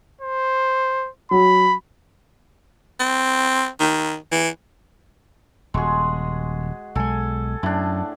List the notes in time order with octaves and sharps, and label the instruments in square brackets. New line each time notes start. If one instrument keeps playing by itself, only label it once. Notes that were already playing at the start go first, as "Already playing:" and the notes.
[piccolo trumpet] C5
[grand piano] F#3 [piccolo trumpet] B5
[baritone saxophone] C4
D#3
E3
[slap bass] D#1 [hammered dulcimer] G#3 F#4 G#4
[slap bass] B1 G#3 [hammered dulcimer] A4 G#5
[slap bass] F#2 [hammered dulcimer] A2 D4